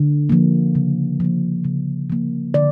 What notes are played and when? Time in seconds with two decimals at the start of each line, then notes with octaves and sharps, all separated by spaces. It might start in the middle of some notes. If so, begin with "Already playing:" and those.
Already playing: D3
0.29 F3 A#3
0.75 C#3
1.20 F3 A#3
1.64 C#3
2.10 F3 A#3
2.54 D3 D5